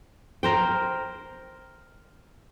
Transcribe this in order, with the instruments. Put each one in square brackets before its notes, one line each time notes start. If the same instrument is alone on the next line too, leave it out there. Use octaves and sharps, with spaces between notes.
[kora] A#4 C5 G5